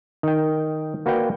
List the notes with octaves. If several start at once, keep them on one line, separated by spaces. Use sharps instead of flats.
D#3 G5
A#3 F#4 B4 D5 G5